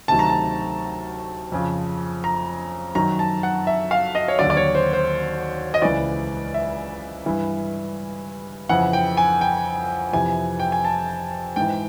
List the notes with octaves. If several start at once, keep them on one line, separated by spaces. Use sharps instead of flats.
D2 C3 D#3 F#3 A5
A#5
A5
F2 C#3 F3
A#5
F#2 D#3 F#3 A#5
A5
F#5
E5
F5
D#5
C#5
D#2 D3 F#3 D5
D5
C#5
C5
C5
D#5
C#2 C#3 E3 D5
E5
G2 E3
F2 C#3 E3 F#5
G5
G#5
G5
F2 C3 E3 G#5
G5
G#5
A5
G#2 E3 G5